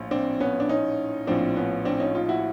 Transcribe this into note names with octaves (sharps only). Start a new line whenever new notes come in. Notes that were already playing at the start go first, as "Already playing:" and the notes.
Already playing: A#1 A2
C4 D4
B3 C#4
D4
C#4 D#4
A#1 A2 F3 C4 D4
B3 C#4
C4 D4
C#4 D#4
D#4 F4
E4 F#4